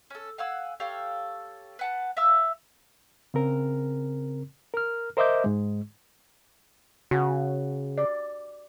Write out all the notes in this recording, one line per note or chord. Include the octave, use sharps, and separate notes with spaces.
C#4 A4
F5 F#5 G#5 E6
G4 A4 C#5 F5
B4 F#5 A5
E5 F5 E6
C#3 C4 A#4
A#4 F6
A#4 C5 D#5 E5 D6 G6
G#2 G#3
C#3 F#4
D5